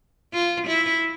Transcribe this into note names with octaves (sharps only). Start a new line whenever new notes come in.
F4
E4